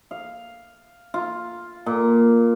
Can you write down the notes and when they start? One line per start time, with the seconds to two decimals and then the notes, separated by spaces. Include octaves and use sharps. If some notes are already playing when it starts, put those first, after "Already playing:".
0.11 F5
1.14 F4
1.86 A#2